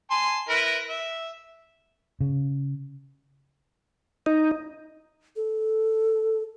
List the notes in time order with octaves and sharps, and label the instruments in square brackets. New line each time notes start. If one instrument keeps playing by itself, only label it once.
[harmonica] G#5 A5 C6
E4 A#4 B4
E5
[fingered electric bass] C#3
[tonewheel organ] D#4
[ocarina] A4